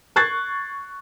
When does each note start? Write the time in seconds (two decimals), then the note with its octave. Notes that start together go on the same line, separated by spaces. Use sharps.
0.16 C#6 F#6 G#6 A6 C7